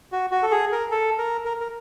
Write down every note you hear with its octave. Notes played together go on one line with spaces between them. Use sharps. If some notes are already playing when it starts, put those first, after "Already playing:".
F#4
F#4
A4
G#4
A#4
A4
A#4
A#4
A#4